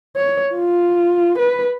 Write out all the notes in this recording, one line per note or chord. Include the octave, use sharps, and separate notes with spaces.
C#5
F4
B4